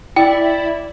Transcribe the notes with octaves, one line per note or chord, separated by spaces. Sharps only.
E4 D5 G5